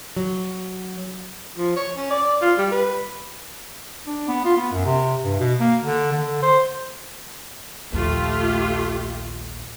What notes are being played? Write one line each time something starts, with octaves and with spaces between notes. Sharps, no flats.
F#3
F3
C#5
C#4
D5
F4
G3
B4
D4
B3
F4
B3
F#2
C3
G2
B2
A#3
D3
D3
C5
A#1 D#2 A3 F4 G4